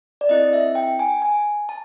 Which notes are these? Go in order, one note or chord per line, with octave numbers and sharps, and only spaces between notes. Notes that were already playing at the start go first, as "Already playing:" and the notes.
D5
C4 E4 A4 D#5
E5
G5
G#5
G#5
A5